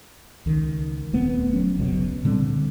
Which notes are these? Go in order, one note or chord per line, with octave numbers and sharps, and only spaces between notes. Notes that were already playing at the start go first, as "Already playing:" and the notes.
C#2 D#3
D#1 A3 B3 C4
F#3 C#4
F1 C#2 B2 F#3
A#2 D3 G3 C4